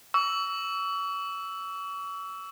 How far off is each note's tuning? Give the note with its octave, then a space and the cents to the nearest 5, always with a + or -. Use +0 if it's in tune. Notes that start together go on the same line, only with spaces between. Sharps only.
C#6 +40 E6 +0